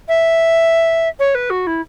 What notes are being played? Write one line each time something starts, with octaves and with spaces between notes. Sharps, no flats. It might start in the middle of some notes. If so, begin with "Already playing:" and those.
E5
C#5
B4
F#4
E4